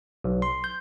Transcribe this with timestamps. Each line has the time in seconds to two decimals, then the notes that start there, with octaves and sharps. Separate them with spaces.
0.24 B1
0.42 C6
0.64 G6